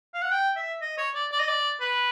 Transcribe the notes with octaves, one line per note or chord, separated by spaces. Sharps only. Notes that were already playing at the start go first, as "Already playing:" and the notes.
F5
F#5
G5
E5
D#5
C#5
D5
D5
D#5
D5
B4